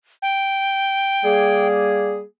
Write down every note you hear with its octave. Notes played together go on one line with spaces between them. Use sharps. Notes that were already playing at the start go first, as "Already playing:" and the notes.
G5
G3 A#3 G#4